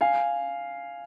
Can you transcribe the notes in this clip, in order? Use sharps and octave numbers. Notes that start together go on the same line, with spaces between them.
F5 G#5